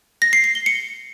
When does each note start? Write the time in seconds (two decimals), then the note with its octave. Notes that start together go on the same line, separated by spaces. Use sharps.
0.22 A#6
0.33 C7
0.44 C7
0.55 G7
0.66 C#7